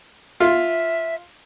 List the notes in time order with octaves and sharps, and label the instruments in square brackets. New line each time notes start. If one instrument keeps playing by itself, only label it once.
[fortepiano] F4 [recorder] E5